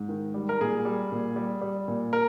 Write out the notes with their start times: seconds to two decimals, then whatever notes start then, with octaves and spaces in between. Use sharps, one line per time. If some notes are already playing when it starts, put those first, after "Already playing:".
Already playing: G#2
0.09 D#3
0.34 G3
0.49 A#4
0.61 A#2 G#4
0.85 G3
1.12 A#2
1.36 G3
1.62 G3
1.88 A#2
2.13 A#4